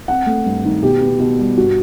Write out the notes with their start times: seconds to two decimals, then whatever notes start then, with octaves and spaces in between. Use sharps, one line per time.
0.08 C4 F#5
0.26 A3
0.46 G2
0.65 D#3
0.83 B2 G4
1.01 B3
1.20 B2
1.39 G3
1.58 G2 F#4